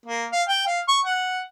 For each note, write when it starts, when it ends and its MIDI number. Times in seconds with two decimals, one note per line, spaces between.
0.06 0.26 58
0.32 0.43 77
0.49 0.65 79
0.67 0.81 77
0.88 1.00 85
1.05 1.41 78